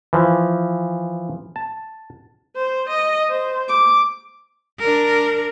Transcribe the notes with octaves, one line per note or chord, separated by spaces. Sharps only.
E3 F3
A5
C5
D#5
C5
D6
D4 A#4